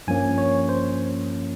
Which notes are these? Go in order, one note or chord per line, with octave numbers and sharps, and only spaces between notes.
G2 F3 A#3 C#4 G#5
C#5
C5